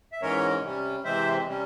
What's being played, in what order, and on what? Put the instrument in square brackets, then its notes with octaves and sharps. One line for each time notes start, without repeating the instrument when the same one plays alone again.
[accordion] E5
G#2 E3 G#3 C#4 A#4 C#5
C3 G3 C#4
C3 E3 G#3 C4 C5 E5
C3 G3 C#4